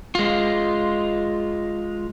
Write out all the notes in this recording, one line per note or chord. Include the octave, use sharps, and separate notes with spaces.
G#3 F4